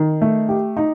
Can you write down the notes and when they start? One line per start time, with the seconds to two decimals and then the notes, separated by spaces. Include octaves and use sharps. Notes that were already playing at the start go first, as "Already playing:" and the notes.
Already playing: D#3
0.22 A3
0.49 G4
0.77 D#4